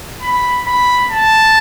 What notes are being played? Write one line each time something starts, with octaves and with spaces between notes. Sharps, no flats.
B5
B5
A5